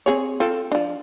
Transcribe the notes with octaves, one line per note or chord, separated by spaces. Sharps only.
C4 G#4 C#5
C4 F4 A4
F3 D4